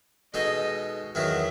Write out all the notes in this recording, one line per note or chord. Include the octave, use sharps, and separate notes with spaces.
B2 G#3 D#4 A4 D#5
E2 D#3 F#3 B3 F#4 E5